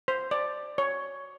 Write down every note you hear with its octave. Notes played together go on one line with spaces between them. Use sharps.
C5
D5
C#5